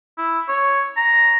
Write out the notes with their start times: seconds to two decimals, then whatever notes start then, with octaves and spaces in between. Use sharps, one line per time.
0.18 E4
0.48 C#5
0.97 A#5